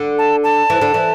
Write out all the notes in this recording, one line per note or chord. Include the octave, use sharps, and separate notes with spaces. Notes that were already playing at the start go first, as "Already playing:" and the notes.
Already playing: D3
A5
A5
E3
D3
E3